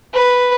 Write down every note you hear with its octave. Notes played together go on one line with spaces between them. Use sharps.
B4